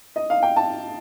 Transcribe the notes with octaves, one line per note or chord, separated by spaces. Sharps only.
D#5
F5
G5
A5